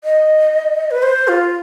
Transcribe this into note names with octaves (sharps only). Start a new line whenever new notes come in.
D#5
B4
C5
F4